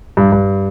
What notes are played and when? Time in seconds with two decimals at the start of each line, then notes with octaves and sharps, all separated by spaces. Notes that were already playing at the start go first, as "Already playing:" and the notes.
0.17 G2
0.32 G2